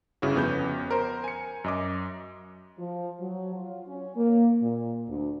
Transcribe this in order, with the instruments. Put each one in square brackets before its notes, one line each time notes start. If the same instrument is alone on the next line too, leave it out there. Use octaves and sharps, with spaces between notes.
[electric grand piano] G1 C#3 E4 F#4
F2 B3 C#4 G6
A#4 C5
G#5 C#7
F#2 D#5 D6
[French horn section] F3
F#3
F4
C#4
A#3
A#2
D2